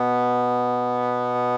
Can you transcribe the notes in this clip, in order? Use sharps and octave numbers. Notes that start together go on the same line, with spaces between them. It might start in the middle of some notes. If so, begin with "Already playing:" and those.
Already playing: B2 B3